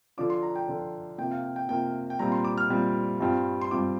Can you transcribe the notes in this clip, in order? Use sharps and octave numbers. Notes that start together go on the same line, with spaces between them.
D3 F3 D4 F4 D6
C6
A#5
G5
D3 F3 D4 F4
C3 A#3 F4 G5
F5
G5
G5
C3 A#3 F4 G5
G5
A#2 G3 C4 F4 A#5
C6
D6
F6
A#2 G3 C4 F4
G2 G3 C4 F4
C6
G2 G3 C4 F4 D6